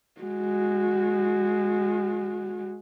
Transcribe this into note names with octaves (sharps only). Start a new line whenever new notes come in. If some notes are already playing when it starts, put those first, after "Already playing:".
G#3 F#4